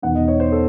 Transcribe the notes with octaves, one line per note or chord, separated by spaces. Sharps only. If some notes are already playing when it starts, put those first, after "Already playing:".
E1 E2 D#3 F#5
D#5
C#5
C5
A4